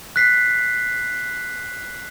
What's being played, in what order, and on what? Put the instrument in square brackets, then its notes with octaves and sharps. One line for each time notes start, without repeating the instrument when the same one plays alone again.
[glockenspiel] F#6 B6 C7